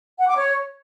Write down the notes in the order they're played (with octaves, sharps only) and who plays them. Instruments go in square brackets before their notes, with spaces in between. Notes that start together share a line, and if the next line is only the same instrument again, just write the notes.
[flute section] F#5
D6
C#5